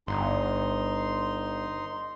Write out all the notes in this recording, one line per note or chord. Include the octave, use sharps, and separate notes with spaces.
G1 D#4 C6